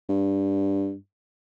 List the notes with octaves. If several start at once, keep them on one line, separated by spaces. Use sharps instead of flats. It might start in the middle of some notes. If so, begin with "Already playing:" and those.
G2